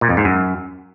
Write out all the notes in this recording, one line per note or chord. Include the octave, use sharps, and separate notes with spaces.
A#2
F2
G#2
F#2